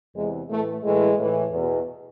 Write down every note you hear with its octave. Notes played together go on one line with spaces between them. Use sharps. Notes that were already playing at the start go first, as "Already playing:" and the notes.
E2 C3 E3 G#3
A2 E3 A3
A2 E3 G#3
A2 E3
E2 B2